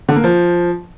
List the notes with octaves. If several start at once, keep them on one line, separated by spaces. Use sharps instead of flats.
D3
A#3
F3